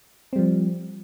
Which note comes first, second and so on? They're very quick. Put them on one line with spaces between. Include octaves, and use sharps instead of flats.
C4 G3 F3